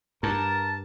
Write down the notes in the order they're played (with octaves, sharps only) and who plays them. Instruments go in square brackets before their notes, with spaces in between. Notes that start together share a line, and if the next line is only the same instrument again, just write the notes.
[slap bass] G2 [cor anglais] A#4 [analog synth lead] A5